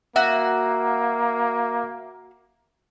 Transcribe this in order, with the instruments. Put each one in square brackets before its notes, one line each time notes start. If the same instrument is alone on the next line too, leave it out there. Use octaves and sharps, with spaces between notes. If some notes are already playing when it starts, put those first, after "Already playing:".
[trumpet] A#3 [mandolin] F#4 [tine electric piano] E5